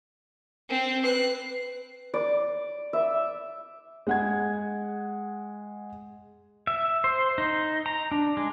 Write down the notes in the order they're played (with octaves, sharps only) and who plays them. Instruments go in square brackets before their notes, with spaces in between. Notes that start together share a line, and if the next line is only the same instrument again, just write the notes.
[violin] C4
[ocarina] B4 [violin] F#6 C7
[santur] D5
E5
[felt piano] G#3 F#5 G#6
[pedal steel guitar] E5
C5
D#4
A#5
D4
G#3